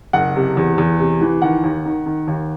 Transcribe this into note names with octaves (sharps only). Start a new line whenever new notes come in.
F#1 F#5
C3
E2
E2
C3
E3
D#3 F#5
D#2
D#3
D#3
D#2